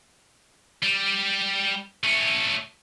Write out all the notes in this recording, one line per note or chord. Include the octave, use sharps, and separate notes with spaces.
G3
A3 C#4